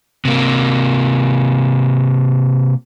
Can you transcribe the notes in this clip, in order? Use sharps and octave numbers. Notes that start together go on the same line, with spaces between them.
C3 A#3